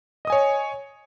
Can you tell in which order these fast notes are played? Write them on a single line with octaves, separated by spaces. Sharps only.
D#5 D#6 G#5 C#5